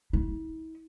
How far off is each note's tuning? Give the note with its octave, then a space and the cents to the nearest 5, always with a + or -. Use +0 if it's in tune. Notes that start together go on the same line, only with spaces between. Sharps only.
E4 -45